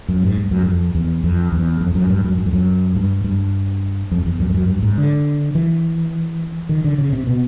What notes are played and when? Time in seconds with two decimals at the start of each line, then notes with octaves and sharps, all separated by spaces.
0.08 F#2
0.23 G#2
0.37 G2
0.51 F#2
0.66 F2
0.95 E2
1.24 F2
1.53 E2
1.81 F2
1.95 F#2
2.10 G2
2.24 F#2
2.38 F#2
2.46 F2
2.53 F#2
2.96 G2
3.24 G2
4.11 F2
4.26 E2
4.40 F#2
4.50 F2
4.54 F#2
4.69 G2
4.83 G#2
4.98 D3
5.55 E3
6.69 D#3
6.84 D3
6.98 C#3
7.13 C3
7.27 B2